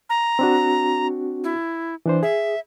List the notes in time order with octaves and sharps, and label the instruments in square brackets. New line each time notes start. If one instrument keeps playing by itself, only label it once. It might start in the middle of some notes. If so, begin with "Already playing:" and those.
[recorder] A#5
[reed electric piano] C4 D4 F#4
[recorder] E4
[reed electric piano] E3 D4 C5
[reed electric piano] G#4 [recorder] E5